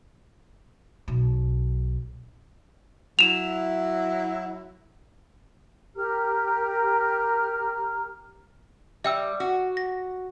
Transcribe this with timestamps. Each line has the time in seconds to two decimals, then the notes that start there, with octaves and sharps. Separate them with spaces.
1.08 B1
3.19 F#3 E4 E7 F7
5.96 G4 A#4 A#5 F6
9.04 G3 E5 G5 E6
9.40 F#4
9.77 A#6